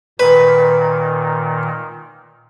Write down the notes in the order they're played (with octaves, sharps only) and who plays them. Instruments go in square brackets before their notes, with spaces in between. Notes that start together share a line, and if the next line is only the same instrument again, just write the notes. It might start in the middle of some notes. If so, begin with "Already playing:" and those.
[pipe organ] A#2 D#3 [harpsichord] B4